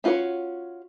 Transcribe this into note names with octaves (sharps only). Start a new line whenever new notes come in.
C#4 F4 F#4 C5 C#5